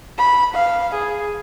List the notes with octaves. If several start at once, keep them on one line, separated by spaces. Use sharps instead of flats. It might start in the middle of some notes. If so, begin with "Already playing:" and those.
B5
F5
G#4